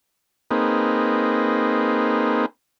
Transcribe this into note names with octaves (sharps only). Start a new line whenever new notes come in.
A#3 C4 D#4 G#4 B4